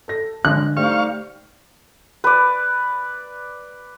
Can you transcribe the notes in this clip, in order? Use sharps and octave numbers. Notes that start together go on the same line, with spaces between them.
A4 A#6
D3 G#3 F#6
G3 A3 D#4 C5 F5 C#6
B4 D5